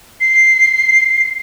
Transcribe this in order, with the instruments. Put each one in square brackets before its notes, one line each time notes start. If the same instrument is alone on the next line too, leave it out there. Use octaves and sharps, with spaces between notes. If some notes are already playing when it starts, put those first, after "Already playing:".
[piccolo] C7